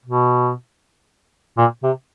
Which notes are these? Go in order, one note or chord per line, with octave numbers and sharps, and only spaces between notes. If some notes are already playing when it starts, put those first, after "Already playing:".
B2
A#2
C3